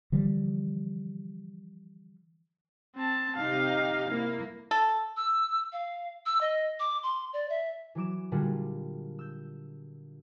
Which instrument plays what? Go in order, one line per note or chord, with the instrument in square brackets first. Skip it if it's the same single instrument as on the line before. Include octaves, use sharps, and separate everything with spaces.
[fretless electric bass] D3 E3 F3 G3
[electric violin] C4 A5
[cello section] C3 D#4 G4 [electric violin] F5
[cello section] A#3 E4
[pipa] A4
[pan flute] E6
F5
E6
D#5
D6
C6
D5
E5
[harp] E3 F#3 D6 E7
A#2 D3 G3 F4 F#4 G#4
E6 G6